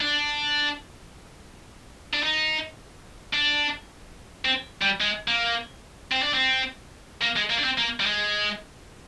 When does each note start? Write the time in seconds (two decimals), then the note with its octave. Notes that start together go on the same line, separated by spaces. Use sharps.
0.01 D4
2.14 D4
2.23 D#4
3.34 D4
4.45 C4
4.82 G3
5.01 G#3
5.28 A#3
6.12 C4
6.22 D4
6.34 C4
7.22 A#3
7.36 G#3
7.50 A#3
7.58 D4
7.64 C4
7.78 A#3
8.00 G3
8.06 G#3